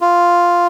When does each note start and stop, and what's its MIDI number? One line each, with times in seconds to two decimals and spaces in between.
0.01 0.67 65